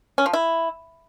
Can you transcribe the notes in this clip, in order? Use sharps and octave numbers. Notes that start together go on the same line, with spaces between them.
C#4
F3
E4